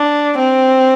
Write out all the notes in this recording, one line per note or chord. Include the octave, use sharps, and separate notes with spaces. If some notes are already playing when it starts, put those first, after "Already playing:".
Already playing: D4
C4